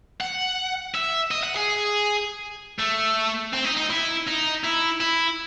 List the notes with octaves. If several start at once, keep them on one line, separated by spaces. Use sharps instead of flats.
F#5
E5
D#5
F#5
G#4
A3
C4
D#4
D#4
E4
D#4
E4
E4